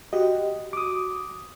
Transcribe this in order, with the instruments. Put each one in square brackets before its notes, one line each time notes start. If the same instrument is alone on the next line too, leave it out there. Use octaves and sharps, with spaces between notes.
[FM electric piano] F#4 [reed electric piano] G4 D#5
[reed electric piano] D6 D#6